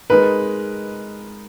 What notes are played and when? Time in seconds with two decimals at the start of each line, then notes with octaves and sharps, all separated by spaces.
0.10 G#3 D#4 A#4 B4